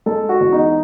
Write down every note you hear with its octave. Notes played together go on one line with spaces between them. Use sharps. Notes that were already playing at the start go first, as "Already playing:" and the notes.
G#3 A4
F#4
E2
D#4